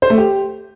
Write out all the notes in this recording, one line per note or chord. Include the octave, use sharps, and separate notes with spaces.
C5
A3
G4